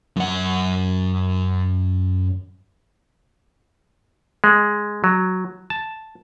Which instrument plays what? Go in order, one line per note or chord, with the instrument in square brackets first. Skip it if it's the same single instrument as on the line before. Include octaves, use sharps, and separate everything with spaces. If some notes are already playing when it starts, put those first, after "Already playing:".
[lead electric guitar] F#2 F#5
[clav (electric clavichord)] G#3
F#3
A5